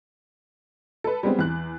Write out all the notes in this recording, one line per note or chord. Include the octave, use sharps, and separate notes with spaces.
A4 B4
G3 G#3 B3 C4
E2 F#6